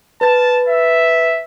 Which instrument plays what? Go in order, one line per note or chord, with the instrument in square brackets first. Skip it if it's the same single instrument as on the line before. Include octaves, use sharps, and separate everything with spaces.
[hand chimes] B4 A6 [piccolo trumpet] A5
[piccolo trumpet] E5